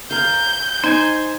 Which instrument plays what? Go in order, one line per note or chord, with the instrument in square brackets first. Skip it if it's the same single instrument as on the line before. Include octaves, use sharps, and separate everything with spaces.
[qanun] A#4 F5 [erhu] G6
[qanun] D#4 C6 [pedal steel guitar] C5 G#5